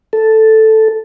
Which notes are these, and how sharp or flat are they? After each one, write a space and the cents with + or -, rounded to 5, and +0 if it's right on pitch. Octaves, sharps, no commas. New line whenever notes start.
A4 +0